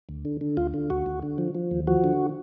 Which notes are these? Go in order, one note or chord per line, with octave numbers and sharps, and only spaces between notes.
D2
D3
D3
D2 F4
D3
D2 F#4
D2
D3
F3
F3
D#2
F3 F#4
D3